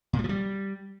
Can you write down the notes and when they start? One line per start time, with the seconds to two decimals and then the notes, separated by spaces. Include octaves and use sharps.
0.13 A#2
0.19 G3
0.24 F3
0.29 G3